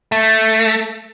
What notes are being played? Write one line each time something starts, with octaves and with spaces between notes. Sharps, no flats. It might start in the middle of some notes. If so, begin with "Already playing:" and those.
A3